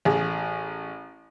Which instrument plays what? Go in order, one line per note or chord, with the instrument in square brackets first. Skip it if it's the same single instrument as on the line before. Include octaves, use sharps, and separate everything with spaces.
[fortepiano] A1 G#4